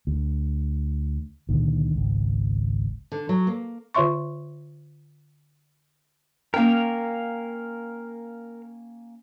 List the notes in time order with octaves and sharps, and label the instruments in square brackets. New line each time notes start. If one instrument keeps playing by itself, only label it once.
[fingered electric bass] D2
C#2 A#2 D3 D#3
G#1 C#2
[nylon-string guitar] D3
F#3
A#3
[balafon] D3 F4 C#5 E5 C6 C#6
[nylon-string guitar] A#3 C#4 G5 [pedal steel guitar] A#4 F5